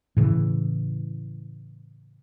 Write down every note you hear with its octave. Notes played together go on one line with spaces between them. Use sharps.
A2 C#3 E3